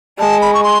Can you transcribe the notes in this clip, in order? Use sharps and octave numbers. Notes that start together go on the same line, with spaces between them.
G#3 A5
B5
C#6
C6